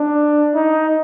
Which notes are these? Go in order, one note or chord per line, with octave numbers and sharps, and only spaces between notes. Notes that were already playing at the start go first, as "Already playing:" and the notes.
Already playing: D4
D#4